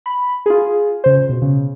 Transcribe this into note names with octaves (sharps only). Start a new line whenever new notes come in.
B5
F4 G#4
C#3 C5
B2
C#3